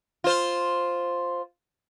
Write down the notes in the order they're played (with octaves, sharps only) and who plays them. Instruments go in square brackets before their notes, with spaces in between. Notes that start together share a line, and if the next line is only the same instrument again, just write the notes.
[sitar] F4 C5